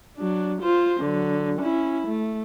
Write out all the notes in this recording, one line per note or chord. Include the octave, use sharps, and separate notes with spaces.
F#3 D4
F4 C5
D3 F#3
C#4 E4
A3